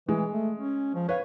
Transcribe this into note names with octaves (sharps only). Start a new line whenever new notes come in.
E3 G#3
A3
C#4
F3
B4 C#5 F5